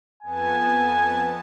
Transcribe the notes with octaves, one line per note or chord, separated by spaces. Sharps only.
F2 B3 G#5 A5